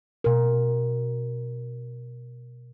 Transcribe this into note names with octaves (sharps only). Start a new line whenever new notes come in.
B2 A#4